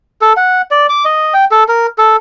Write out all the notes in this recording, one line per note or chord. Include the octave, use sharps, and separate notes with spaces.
A4
F#5
D5
D6
D#5
G5
A4
A#4
A4